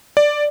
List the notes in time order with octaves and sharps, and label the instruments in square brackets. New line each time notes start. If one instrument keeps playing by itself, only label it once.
[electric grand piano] D5